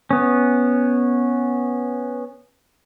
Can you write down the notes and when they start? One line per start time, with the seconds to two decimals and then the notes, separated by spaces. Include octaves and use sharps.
0.11 B3 C#4